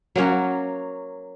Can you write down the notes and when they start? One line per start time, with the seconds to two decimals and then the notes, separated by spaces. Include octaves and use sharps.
0.16 F#3 A#3 C#4 F#4